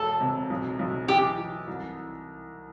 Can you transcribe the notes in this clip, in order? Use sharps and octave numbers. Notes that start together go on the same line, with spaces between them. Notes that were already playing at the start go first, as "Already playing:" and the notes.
Already playing: E1 A4
C3
B1
B1
E3 G4
E3
C2